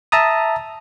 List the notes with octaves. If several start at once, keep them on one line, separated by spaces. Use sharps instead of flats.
E5 A5 A#5 D#6